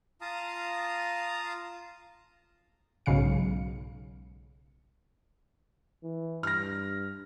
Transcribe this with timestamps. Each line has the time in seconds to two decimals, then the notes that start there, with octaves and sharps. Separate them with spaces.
0.21 F4 F5 A5 A#5 D#6
3.06 B1 G#2 C#3 F5 C#7
6.03 E3
6.43 G2 F6 A#6